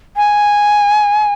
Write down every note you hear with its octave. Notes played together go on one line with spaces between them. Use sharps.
G#5